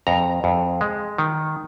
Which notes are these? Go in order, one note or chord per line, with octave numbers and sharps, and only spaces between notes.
F2 A#5
F2
G#3
D#3